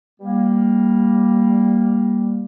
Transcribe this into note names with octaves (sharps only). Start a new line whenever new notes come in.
G3 A#3